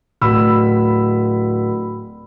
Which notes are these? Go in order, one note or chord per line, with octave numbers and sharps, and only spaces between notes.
D1 B5 E6